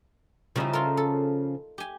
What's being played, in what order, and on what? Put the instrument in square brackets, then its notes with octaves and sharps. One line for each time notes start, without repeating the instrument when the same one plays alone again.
[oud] C#3 F3 C#4 [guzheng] G3 D#4 E4
[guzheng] F4 A4 A#4
A4
G4 G#5